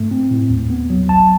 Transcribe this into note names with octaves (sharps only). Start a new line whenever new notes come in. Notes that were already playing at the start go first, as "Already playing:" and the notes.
Already playing: G#2 A3
C4
A2
D#2
B3
F#3
A#1 A5